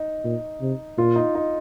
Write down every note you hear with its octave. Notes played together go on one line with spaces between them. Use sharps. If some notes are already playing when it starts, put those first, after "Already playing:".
Already playing: D#4
A#2
C3
A#2 F4
D#4
D#4